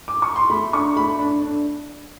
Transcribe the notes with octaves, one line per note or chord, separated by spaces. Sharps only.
D6
C#6
C6
A3 B5
D4 C#6
A3 B5
D4
D4